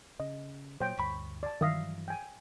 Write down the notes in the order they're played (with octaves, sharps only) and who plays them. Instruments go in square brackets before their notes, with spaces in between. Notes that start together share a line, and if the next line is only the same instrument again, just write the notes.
[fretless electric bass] C#3 [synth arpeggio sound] D#5
[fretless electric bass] A#2 F#3 [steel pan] C5 C#5 G5
[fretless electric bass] D2 G2 [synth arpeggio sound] B5 C#6 B6
[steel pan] D5 A5
[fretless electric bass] G2 E3 F#3 [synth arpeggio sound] D#3 D#6 A#6 [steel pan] E5 F5
[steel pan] G5 G#5